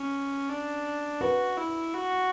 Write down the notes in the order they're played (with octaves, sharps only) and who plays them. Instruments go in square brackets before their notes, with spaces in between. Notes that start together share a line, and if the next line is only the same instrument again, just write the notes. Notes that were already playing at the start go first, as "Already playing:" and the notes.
Already playing: [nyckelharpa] C#4
D4
[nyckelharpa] F#4 [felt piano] B4
[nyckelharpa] E4
F#4